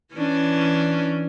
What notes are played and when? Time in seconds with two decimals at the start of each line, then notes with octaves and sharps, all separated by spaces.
0.15 E3 C#4 D4